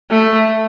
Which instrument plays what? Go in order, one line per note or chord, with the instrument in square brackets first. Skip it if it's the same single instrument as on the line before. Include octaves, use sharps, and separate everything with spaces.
[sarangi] A3